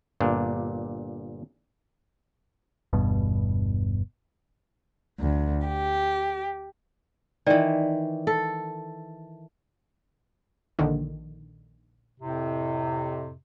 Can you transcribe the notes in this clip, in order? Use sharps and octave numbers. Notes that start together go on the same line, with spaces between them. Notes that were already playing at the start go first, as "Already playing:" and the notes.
G1 A#2 D4
G1 E2 G2 B2
D2
G4
D#3 E3 D5
A4
A#1 D3 D#3
F2 A2 C3